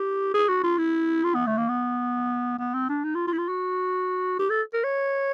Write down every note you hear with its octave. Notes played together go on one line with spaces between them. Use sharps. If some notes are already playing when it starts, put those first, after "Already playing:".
Already playing: G4
G#4
F#4
F4
E4
F4
B3
A3
A#3
B3
B3
C4
D4
D#4
F4
F4
E4
F4
F#4
G4
A4
A#4
C#5